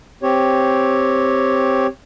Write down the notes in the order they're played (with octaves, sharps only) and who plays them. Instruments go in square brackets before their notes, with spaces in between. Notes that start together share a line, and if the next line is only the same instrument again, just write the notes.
[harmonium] C4 G4 C#5